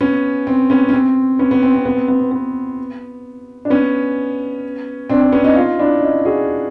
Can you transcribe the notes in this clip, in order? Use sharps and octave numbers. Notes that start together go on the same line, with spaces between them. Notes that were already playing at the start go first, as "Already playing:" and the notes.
B3 C#4
C4
B3 C#4
C#4
C4
B3 C#4
B3
C4
C4
B3
C4
B3
C4
B3
D4
B3 C#4
C4 D4
C4
B3 C#4
C#4 D#4
D#4 F4
D4 E4
C#4 D#4
F#4 G#4